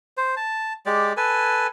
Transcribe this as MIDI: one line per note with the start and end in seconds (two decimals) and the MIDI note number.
0.17 0.35 72
0.37 0.73 81
0.86 1.13 56
0.86 1.13 67
0.86 1.13 74
1.17 1.67 69
1.17 1.67 71
1.17 1.67 80